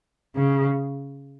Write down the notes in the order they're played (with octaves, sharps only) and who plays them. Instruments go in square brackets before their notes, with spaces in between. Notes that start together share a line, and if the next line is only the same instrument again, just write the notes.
[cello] C#3